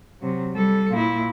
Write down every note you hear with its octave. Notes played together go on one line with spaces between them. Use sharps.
C3 F#3
G3 A4
A#2 E4